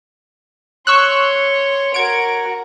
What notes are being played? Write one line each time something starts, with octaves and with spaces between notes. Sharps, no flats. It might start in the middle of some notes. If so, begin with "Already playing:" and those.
C#5 C6 C#6 E6 F#6
F#4 A#4 G#6 D7